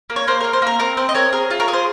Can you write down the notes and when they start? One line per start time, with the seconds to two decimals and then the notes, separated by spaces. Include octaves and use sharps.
0.10 A#3
0.16 C#5
0.28 A#3 C5
0.40 A#3 A#4
0.53 C5
0.62 A#3 A#4
0.80 C4 A#4
0.97 C4 C5
1.09 D#5
1.15 C4 A#4 C#5
1.32 G#4 A#4
1.50 F4
1.60 A#4 C#5
1.68 G#4
1.73 C5